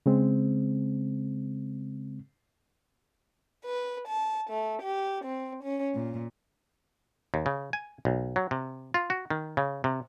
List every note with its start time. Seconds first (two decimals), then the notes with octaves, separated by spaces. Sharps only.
0.06 C#3 G#3 C4
3.65 B4
4.07 A5
4.50 A3
4.82 G4
5.25 C4
5.62 C#4
5.95 A#2
7.34 D#2
7.46 C#3
7.73 G#5
8.05 B1
8.36 F#3
8.51 C3
8.94 F4
9.10 F#4
9.30 D#3
9.57 C#3
9.84 C3